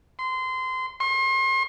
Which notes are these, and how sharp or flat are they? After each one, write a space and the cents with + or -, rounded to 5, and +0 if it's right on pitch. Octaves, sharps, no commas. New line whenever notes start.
C6 -20
C6 +40